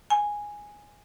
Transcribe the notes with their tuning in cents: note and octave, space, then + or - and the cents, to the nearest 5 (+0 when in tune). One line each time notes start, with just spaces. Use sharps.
G#5 -5